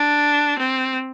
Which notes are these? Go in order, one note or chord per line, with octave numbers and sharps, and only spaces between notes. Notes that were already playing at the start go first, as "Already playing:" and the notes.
Already playing: D4
C4